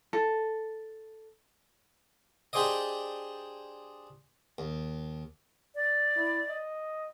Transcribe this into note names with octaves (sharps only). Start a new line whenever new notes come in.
A4
D4 G4 G#4 C5 D5 D#5
D#2
D5
E4
D#5